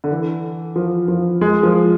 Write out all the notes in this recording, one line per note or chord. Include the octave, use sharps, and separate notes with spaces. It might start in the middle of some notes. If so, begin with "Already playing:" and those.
D3
E3
F3
F3
G#3
F3